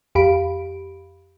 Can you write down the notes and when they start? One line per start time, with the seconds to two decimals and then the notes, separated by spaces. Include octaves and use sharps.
0.15 F2 G4 F5 B5 D7